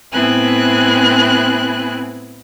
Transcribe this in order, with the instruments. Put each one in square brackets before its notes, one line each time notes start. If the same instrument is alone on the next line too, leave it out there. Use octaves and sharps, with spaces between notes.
[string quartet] A2 B3 C4 E4 G#5 F#6